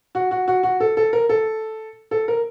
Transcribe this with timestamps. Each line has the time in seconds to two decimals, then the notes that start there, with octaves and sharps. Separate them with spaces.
0.15 F#4
0.31 F#4
0.48 F#4
0.63 F#4
0.80 A4
0.97 A4
1.13 A#4
1.29 A4
2.11 A4
2.28 A#4